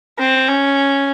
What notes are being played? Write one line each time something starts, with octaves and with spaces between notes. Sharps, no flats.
C4
C#4